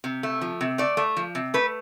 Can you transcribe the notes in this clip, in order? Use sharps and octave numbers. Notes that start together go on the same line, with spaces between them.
C3
A3
F3
C3
A3 D5
A3
F3
C3
A3 B4